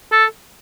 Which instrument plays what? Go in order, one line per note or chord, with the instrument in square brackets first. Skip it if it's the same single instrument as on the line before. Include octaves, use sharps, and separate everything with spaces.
[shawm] A4